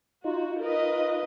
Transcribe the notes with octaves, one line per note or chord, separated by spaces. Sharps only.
D#4 F4 F#4
A#4 B4 D#5